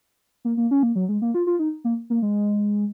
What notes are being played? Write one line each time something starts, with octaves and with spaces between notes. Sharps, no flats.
A#3
A#3
C#4
A#3
F#3
G#3
A#3
F4
F4
D#4
A#3
A#3
G#3